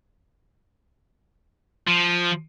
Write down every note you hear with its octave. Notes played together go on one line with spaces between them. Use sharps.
F3